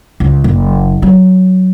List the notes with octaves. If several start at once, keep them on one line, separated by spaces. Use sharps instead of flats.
C#2
F#1
F#3